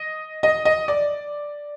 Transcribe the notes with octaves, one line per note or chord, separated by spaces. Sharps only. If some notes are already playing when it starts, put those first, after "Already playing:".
Already playing: D#5
D#5
D#5
D5